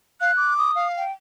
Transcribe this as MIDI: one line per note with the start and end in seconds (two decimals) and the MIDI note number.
0.21 0.32 77
0.21 0.53 90
0.37 0.71 86
0.58 0.88 87
0.75 1.04 77
0.97 1.11 79